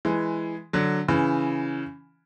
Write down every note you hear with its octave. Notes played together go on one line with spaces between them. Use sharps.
E3 G#3
D3 F#3
C#3 E3